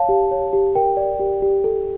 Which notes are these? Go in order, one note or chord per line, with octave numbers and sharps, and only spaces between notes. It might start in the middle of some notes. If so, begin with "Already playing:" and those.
Already playing: C#5 F5 A5
G4
C#5
G4
A#4 G5
D5
G4
G4
A4